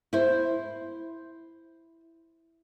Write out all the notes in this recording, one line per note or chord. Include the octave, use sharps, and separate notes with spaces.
E4 C5